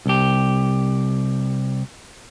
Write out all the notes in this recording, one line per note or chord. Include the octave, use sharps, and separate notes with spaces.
C2 G4